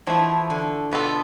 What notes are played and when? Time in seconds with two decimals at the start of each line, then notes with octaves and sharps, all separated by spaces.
0.07 E2 E3 F3 A3 E4
0.50 D3
0.91 B2 B3 F4 A4